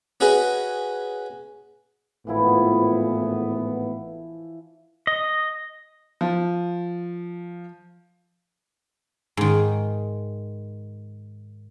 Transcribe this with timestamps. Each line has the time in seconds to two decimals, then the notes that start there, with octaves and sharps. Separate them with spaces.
0.20 C#4 F#4 G#4 B4 D#5
2.27 G#1 A2 E3 F3 B3 E4
5.07 D#5
6.21 F3
9.37 G#2 D#3